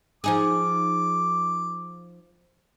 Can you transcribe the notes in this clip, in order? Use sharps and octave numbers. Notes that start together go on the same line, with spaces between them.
F3 D#4 G#4 D6